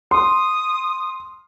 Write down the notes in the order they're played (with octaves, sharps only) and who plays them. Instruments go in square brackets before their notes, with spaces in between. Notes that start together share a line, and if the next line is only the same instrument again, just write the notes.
[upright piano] C6 [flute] D#6